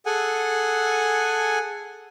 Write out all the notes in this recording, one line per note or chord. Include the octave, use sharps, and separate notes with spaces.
G#4 A4 F#5 G#5